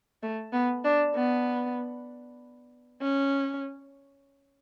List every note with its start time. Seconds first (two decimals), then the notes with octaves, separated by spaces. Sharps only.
0.23 A3
0.53 B3
0.84 D4
1.15 B3
3.02 C#4